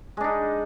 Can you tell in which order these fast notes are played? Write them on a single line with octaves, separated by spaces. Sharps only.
G#3 D4 D#4